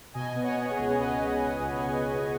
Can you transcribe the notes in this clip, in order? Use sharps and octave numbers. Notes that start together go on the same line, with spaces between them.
B2 D#5 G#5
B3
C#5 F#5
B3
G#4 C#5
C#2
B2 B4 D#5
B3
B2
C#2
B3
C#2